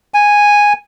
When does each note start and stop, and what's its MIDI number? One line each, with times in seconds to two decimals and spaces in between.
0.14 0.73 80